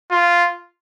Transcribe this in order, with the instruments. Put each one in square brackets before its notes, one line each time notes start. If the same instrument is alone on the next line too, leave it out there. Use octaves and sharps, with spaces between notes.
[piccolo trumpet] F4